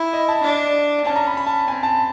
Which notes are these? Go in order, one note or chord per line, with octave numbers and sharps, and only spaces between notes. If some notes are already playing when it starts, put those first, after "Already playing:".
Already playing: E4
D#5
A5
D4
C#4 A5
A#5
B5
B5
A5
C4 G#5
A5